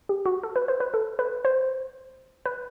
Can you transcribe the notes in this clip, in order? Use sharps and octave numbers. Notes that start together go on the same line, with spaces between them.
G4
F#4
A4
B4
C5
B4
A4
B4
C5
B4